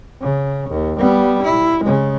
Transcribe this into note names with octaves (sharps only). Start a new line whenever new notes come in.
C#3
D#2
G3 B3
E4
C#3 G#3